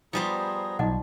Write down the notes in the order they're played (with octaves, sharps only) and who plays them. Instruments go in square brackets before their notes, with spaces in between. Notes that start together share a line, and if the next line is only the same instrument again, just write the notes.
[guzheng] F3 G3 C5 [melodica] B3 G#4 A#5
[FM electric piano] B1 [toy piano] D#4 D#5 F#5